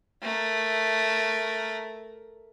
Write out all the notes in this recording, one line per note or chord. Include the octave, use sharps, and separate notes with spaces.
A3 A#4